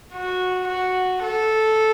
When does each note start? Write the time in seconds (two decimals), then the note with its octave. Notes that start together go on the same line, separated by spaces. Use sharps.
0.13 F#4
0.68 F#4
1.23 A4